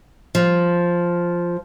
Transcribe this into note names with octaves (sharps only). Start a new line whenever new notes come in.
F3